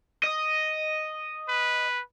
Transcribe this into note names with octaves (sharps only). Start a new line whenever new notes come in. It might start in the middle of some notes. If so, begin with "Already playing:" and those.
D#5
B4